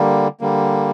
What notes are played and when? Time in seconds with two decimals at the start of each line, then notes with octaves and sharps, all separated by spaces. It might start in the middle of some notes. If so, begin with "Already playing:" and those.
Already playing: D3 G3 A#3
0.41 D3 G3 A#3